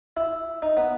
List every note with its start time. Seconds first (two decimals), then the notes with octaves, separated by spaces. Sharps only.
0.17 E4
0.62 D#4
0.77 B3